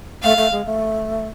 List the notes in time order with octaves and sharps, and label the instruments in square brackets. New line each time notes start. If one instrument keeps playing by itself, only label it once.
[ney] A3 [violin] F5
[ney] A3
G#3
A3